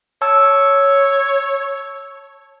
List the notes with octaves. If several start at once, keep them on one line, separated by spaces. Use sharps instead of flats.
C#5 A5 E6